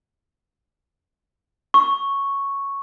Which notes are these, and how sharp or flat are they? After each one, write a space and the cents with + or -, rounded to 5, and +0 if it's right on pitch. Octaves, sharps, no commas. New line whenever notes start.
C#6 +0